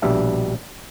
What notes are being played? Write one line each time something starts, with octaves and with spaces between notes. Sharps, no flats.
A#1 B2 G3 D4 E5